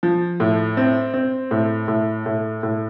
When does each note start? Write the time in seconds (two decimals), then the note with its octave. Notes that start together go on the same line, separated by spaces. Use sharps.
0.03 F3
0.40 A2
0.77 C4
1.13 C4
1.51 A2
1.88 A2
2.26 A2
2.63 A2